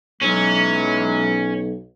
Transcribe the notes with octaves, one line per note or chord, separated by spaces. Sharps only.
B1 E3 F#3 G#3 C#4